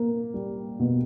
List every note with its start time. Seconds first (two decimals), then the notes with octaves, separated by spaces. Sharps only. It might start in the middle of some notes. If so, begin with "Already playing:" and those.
Already playing: A#3
0.34 G3
0.80 B2